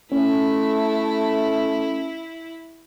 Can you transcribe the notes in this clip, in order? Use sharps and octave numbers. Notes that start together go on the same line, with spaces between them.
A3 C#4 E4